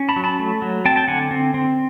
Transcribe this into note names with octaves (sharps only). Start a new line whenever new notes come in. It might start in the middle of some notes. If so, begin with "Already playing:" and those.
Already playing: C#4
A5 B5
F#3
A5 B5
A3
F#3
C4 G5 A5
G5 A5
D3 F#5 G#5
C4
C4